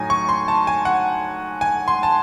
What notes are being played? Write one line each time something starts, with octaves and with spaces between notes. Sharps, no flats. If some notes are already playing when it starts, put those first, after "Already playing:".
Already playing: A2 F#3 D#4 G#5
C#6
C6
A5
G#5
F#5
G#5
C6
A5